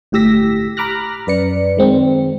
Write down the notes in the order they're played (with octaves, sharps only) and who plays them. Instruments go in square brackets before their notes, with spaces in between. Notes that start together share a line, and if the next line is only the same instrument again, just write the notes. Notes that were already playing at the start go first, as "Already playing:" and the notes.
[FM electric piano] G1 A2 G4 E6 A#6 B6
A#5 B5 D6 F6 F#6 A#6
F#2 B4 D5 C#7
D#3 G#3 C4